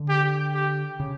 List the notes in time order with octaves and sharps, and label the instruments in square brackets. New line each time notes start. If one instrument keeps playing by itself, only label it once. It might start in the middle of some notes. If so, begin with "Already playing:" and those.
Already playing: [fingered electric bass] D3
[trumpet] G4
G4
[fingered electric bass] C#3